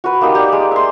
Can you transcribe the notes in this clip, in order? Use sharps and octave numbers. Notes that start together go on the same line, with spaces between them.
F#4 B4
A#3 D#4 G4
G4 D5
G#3
E5 C6